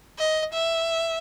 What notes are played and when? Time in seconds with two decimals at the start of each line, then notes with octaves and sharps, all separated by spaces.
0.18 D#5
0.53 E5